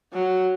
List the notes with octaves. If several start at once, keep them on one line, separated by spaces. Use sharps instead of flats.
F#3